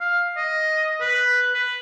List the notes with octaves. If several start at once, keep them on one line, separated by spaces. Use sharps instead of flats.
F5
D#5
B4
B4